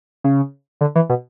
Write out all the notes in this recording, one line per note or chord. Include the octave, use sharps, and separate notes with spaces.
C#3
D3
E3
B2